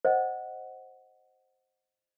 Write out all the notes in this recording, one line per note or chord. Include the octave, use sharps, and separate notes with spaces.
C5 D#5 F#5